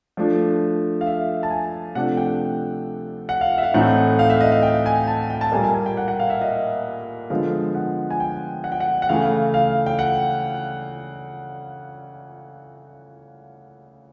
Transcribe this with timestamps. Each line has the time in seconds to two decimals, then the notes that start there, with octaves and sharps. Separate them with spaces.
0.17 F3 A3 D4
1.01 F5
1.07 E5
1.43 A5
1.50 G#5
1.95 C3 F3 A3 D4 F#5
2.17 G5
3.29 F#5
3.41 F5
3.58 E5
3.63 F5
3.74 A2 E3 A3 C4 D#4 F#5
4.19 F5
4.30 E5
4.41 D#5
4.52 F5
4.63 G5
4.86 G#5
5.08 A5
5.30 G5
5.41 A5
5.52 A#2 G3 A#3 G#5
5.64 G#5
5.74 G#5
5.86 G5
5.97 F#5
6.08 F#5
6.20 F5
6.30 E5
6.41 D#5
7.30 D3 F3 G#3 B3 F5
7.75 F#5
8.10 G#5
8.20 G5
8.64 F#5
8.72 G5
8.80 F#5
9.02 F#5
9.09 C#3 E3 A3 F5
9.54 F5
9.86 G5
9.99 F#5